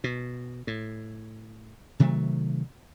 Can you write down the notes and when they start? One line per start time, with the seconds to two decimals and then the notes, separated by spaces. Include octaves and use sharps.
0.04 B2
0.67 A2
1.99 C3 D#3 F#3 A3